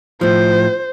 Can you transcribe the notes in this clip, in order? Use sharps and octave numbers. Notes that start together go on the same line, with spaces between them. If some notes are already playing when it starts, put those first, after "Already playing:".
A2 F3 C5